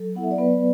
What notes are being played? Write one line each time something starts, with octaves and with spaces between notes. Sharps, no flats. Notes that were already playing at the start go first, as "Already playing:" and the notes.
Already playing: F#3 A4
B3 E4 F#5
E5
D5
F#3 B3 B4